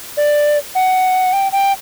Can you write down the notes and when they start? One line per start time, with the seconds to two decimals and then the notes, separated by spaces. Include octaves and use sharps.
0.17 D5
0.75 F#5
1.33 G5
1.52 G5